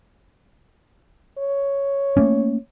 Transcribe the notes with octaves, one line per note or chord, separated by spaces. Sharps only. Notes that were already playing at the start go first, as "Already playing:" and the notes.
C#5
A3 A#3 C#4